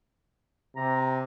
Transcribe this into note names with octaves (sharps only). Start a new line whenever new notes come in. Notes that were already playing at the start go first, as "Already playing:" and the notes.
C3 A#5